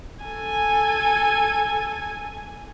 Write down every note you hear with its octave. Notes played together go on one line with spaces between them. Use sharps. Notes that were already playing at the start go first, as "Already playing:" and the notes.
A4 G#5